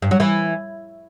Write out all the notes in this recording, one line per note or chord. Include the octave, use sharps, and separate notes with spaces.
G2
F#3
E3